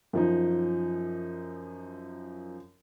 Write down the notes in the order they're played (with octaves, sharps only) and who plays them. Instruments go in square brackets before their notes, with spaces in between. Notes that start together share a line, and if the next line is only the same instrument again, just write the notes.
[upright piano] F#2 F3 D#4